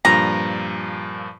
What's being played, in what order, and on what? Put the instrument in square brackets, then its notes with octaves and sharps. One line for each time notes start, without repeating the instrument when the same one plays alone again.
[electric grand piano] G2 A#2 F3 [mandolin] A#5